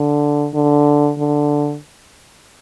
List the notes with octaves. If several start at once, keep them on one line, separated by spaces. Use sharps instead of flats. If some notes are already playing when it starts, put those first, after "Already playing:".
Already playing: D3
D3
D3